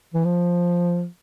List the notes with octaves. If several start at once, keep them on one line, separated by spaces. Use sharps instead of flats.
E3
F3